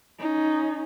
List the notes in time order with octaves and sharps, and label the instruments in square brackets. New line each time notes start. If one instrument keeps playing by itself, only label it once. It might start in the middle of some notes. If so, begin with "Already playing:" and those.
[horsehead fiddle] C#4 D#4